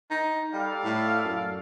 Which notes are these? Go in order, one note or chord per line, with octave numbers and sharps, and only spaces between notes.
D#4
G3 A4 D5 F5
A2
F#2